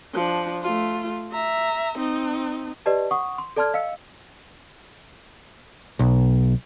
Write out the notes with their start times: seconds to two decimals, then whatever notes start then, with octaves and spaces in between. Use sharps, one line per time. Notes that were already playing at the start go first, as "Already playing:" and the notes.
0.14 F3 D4
0.63 A3 F4
1.32 E5 A#5
1.98 C4 D#4
2.86 G4 B4 D5 D#5 A5
3.11 F#5 C#6 D#6
3.38 C6
3.57 A4 D5 A5 C6 F6 G#6
3.74 D#5 F5 E6 C#7
5.99 B1